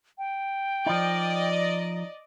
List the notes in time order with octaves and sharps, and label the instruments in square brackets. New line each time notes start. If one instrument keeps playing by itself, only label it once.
[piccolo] G5
[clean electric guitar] F3 D#4 [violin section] D5 D#5